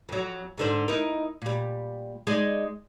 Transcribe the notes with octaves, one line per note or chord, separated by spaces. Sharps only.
F2 F#3
G#2 D3 C5
D#4 E4 A#4
A#2 G3
G#3 D#4 D5